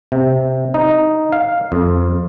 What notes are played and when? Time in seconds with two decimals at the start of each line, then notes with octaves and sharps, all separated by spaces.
0.12 C3
0.74 D#4
1.32 F5
1.72 F2